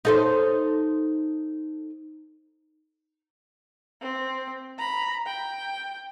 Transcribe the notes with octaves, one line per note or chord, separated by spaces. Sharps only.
D#4 A4 C5
C4
A#5 B5
G5